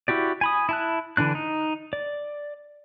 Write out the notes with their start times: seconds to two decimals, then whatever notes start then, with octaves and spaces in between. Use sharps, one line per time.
0.08 E4 F#4 G4 D5
0.41 G#5 B5 D#6
0.69 E4 A5 F#6
1.17 D3 E3 D4 F#6
1.35 D#4
1.93 D5